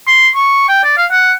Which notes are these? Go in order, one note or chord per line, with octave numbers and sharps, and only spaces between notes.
C6
C#6
G5
D5
F5
F#5